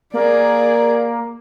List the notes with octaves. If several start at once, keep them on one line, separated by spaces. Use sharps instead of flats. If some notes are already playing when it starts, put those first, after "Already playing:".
A#3 G#4 D5